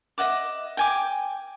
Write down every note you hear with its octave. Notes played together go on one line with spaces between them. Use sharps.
D#5 E5 F#5 D6
G5 G#5 D6